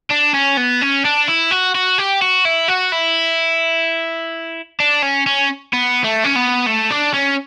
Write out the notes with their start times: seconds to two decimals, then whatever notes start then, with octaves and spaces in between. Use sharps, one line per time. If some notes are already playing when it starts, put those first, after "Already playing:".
0.11 D4
0.34 C#4
0.57 B3
0.81 C#4
1.04 D4
1.28 E4
1.51 F#4
1.75 F#4
1.98 G4
2.21 F#4
2.45 E4
2.68 F#4
2.92 E4
4.80 D4
5.02 C#4
5.27 C#4
5.73 B3
6.04 A3
6.24 C#4
6.36 B3
6.67 A3
6.90 D4
7.14 C#4